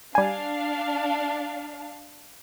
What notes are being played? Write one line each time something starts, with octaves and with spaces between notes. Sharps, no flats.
G3 D4 F5 G#5